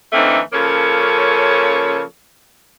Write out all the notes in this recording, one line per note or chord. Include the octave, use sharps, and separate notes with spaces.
D3 E3 A3 A#3 C4 D#4
C#3 F3 A#3 C#4 A4 C#5